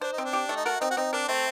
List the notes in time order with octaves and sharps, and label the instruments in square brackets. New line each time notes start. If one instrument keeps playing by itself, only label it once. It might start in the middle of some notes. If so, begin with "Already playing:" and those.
[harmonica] D4 [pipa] C5
[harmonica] D#4
[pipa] C4
[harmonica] D4
[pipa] G4
A3
[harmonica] D#4
[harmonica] F#4 [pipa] A#4
[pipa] C4 [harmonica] D#4
[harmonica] F#4
[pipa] C4 [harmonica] D#4
[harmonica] D4 [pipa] A#4
[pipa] A3 [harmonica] C4